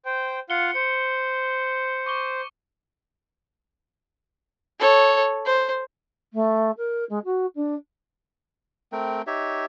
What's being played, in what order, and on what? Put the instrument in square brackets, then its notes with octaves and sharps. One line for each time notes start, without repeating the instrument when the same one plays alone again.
[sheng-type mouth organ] C5 G5
[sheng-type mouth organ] F4 F5 F#5 [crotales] C#7 G7
[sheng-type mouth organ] C5 [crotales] C#7
[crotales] C#6 D6 G7
[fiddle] A4 C#5
C5
[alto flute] A3
A#4
G#3
F#4
D4
[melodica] A3 C4 A#4 G5
D#4 G4 C#5 E5